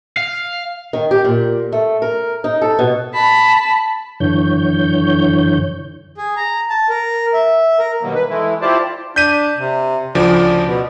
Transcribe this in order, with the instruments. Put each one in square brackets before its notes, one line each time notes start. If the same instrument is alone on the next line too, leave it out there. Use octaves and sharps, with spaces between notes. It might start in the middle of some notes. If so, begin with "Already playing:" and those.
[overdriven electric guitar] F5
[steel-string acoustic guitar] D#3
G4
A#2
A3
A#4
D#4
A4
B2
[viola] A5 B5
[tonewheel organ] F#2 D3 E3 C#5 G6
[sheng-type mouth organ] G#4
A#5
A5
A#4
E5
A#4
[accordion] B2 D#3 F#3 G3 A#3
B4
E3 G#3 A3 E4
E4 F4 G4 C5 D5 A5
[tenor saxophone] D4 [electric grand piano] G6 B6 D#7
[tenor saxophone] C3
[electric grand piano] D2 C#3 F3 [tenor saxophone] D5
[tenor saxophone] B2